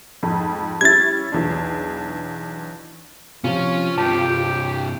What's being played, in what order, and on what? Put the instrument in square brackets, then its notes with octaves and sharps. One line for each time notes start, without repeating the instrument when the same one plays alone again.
[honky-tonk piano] F2 G#2
[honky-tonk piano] G3 C#4 E4 [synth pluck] G#6 A6
[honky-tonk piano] B1 E2 D4
[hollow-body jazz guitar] C3 F3 [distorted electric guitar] C#4 [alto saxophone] F4
[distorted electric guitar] G2 C3 [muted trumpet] G4 [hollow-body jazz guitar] A5